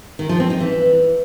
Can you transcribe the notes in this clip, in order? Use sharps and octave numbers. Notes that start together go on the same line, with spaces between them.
D#3
F3
C4
D#4
E3